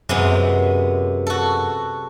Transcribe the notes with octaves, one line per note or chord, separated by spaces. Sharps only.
F#2 C3 G#3 B3
F#4 A4